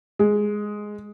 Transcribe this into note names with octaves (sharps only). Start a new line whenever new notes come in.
G#3